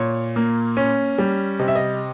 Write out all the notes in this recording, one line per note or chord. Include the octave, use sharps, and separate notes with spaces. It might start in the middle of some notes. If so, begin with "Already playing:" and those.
Already playing: A#2 C#5
A#3
C#4
G3
C3 D#5
E5
D#5